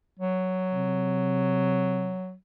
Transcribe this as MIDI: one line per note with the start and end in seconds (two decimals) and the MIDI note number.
0.19 2.34 54
0.73 2.15 48